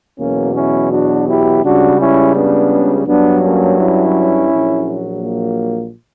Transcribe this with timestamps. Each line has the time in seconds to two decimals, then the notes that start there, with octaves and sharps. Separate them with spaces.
0.19 E2 B2 F#3 A#3 C#4
0.55 C#4 E4
0.91 D4 F#4
1.27 E4 G4
1.63 C#2 C#3 G3 D4 F#4
1.99 C#4 E4
2.34 B3 D4
3.06 G2 F#3 B3 D4
3.43 A#3 C#4
3.78 C#4 E4
4.50 A#1 A#2 F#3
5.22 A#3